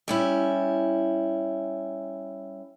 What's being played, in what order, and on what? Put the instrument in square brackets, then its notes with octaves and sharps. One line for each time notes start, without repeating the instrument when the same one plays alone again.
[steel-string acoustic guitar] G3 C#4 E4